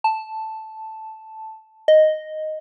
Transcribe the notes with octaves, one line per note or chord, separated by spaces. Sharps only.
A5
D#5